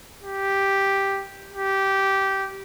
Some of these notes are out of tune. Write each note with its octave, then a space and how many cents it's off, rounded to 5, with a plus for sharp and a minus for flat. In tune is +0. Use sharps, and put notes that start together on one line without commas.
G4 +0
G4 -15